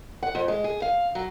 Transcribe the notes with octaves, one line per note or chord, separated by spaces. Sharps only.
F#5
F2
G#3
G#4
F5
F#3